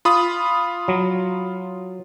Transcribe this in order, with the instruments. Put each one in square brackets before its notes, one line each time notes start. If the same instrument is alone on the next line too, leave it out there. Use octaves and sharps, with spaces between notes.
[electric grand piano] F4 B5 D#6
[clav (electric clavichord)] F#3